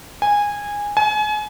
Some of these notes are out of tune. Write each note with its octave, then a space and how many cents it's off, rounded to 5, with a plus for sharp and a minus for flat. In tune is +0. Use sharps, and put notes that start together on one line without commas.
G#5 -15
G#5 +35